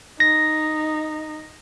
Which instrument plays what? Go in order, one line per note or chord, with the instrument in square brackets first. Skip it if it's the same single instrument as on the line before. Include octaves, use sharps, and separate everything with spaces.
[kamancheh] D#4 [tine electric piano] A#6